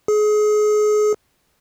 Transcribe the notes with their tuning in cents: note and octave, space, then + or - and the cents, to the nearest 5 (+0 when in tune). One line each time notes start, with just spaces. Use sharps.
G#4 +30